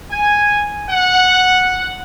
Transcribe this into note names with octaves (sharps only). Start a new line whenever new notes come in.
G#5
F#5